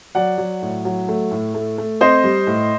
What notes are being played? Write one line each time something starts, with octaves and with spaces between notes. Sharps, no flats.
F#3 D5 F#5
F#3
A2
F#3
A3
A2
A3
A3
C4 C5 D#5
G3
A2